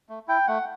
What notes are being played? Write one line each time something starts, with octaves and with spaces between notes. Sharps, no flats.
A3
E4 G5
A3 F#5